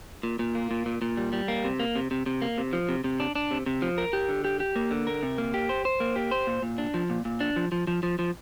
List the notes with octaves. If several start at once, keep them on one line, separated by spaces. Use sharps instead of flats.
A#2
A#2
A#3
A#2
A#2
A#2
G3
G3
A#3
C3
A#3
C3
C3
C3
A#3
C3
F3
C3
C3
D4
D4
C3
C3
F3
A#4
G4
D3
G4
G4
A#3
D3
A#4
C3
A#3
G4
C5
C5
A#3
G4
C5
A#2
A#2
D4
F3
A#2
A#2
D4
F3
F3
F3
F3
F3